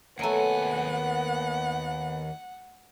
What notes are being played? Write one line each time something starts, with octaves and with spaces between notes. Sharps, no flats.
D#2 F#3 A3 B3 F#5 G#5